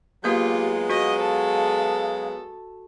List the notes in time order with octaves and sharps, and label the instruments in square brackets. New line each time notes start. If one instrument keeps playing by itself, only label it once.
[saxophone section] F#3 G#3 B3 [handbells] A#3 G6 [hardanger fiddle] F4 [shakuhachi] G4
[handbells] F#4 [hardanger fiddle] D#5 [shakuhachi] F5
[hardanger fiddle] A4